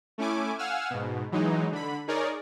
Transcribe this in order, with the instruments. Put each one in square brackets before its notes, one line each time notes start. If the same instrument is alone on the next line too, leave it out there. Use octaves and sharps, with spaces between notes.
[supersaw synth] A3 C#4 E4 G#5 D6
F5 F#5 G#5 E6 F6
G#2 B2
E3 F#3 G#3 D#4
D3 B5
D#4 G#4 A#4 C#5 D5